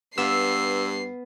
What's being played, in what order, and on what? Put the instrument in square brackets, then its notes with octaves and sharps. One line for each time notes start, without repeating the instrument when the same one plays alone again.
[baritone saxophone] G2 [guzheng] B3 F5 [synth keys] E6 [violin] C7